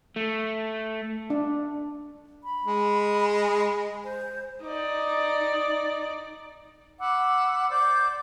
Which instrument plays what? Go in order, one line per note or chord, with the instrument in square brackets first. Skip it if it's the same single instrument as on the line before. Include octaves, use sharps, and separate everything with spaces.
[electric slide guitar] A3
[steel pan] D4
[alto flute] B5
[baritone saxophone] G#3
[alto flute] C5
[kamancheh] D#4 D5
[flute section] F#5 B5 D6 E6
C5 D5 D6 G6